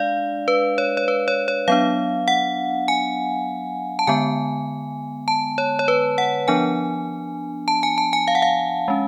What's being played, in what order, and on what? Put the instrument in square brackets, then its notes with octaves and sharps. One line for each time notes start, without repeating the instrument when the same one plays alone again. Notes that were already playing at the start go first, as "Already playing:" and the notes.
Already playing: [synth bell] G#3 D4 D5 F5
B4
C#5
C#5
B4
C#5
C#5
F#3 B3 D4 F5
F#5
G#5
A5
D3 G#3 B3 G#5
A5
C#5
C#5
B4
F#5
F3 B3 D4 G#5
A5
G#5
A5
G#5
F5
F#5
F5
G#3 C#4